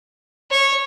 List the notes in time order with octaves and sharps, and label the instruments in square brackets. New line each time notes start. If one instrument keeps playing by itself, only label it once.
[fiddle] C#5